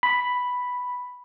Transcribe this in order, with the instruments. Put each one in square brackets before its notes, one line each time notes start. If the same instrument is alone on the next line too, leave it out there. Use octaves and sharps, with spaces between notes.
[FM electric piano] B5